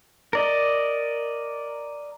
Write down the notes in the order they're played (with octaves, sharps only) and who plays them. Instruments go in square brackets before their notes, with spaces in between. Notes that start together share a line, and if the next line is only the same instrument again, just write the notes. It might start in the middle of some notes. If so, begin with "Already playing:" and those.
[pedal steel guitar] A#4 D5 D#5